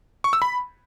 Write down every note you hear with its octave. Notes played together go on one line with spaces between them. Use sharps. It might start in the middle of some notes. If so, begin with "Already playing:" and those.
C#6
E6
B5